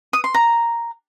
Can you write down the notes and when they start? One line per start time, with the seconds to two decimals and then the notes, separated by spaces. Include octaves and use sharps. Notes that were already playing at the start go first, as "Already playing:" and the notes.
0.13 D#6
0.24 C6
0.34 A#5